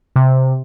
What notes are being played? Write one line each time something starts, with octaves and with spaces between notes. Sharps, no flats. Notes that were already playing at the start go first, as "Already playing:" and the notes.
C3